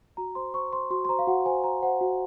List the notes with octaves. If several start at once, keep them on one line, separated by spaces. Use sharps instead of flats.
F#4 A#5
C5 C6
C5 C#6
C5 C6
F#4 C6
C6
C5 A#5
F5
F#4 F#5
C5 G#5
C5 A#5
C5 F#5
F#4